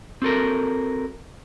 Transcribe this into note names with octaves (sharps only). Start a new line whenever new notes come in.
C4 F#4 A4 A#4